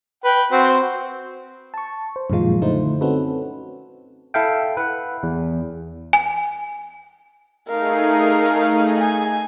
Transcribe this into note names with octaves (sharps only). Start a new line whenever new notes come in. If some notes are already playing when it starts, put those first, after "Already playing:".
B4 G5
C4 F#4 C5
A5 C#6
C5
F#2 A#2 D#3 F3 G#3 F4
D3 A3 D#4 E4 C5
C4 C#4 D#4 F#4 A4 B4
E4 A4 E5 F5 G5
B4 F#5
E2
G#5
A3 D#4 G#4 A#4 F5
G#5